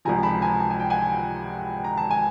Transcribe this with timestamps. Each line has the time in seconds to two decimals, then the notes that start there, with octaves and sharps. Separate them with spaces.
0.05 C#2 C3 F3 G#5 A#5
0.23 A5 B5
0.42 G#5 A#5
0.60 A5
0.70 G#5
0.80 G5
0.90 F#5 G#5
1.84 A#5
1.98 A5
2.11 G#5